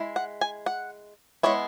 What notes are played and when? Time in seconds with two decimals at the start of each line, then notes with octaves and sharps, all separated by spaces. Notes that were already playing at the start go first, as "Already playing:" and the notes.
Already playing: G#3 E4
0.16 F#5
0.41 G#5
0.66 F#5
1.43 G#3 B3 E4 C#5